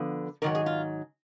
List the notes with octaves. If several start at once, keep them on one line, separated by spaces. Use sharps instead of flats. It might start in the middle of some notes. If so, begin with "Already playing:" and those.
Already playing: D3 F3 B3
G#2 D#3 F#3 A#4
G#4
F4